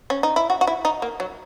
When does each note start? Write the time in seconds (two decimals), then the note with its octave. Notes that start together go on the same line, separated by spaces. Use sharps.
0.10 C#4
0.23 D#4
0.36 E4
0.50 F#4
0.61 F#4
0.67 E4
0.85 D#4
1.02 A#3
1.20 F#3